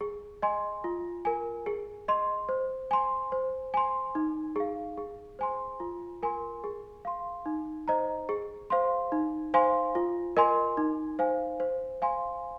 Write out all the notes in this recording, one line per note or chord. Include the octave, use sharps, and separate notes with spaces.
G#4
D#5 G#5 C6
F4
A#4 G#5
G#4
D#5 C6
C5
G#5 C6
C5
G#5 C6
D#4
G#4 F5
G#4
C5 G#5 C6
F4
A#4 G#5 C6
G#4
F5 C6
D#4
C5 D#5 A#5
G#4
C5 F5 C6
D#4
C5 F5 G#5 C6
F4
A#4 D#5 G#5 C6
D#4
C5 F5 G#5
C5
F5 G#5 C6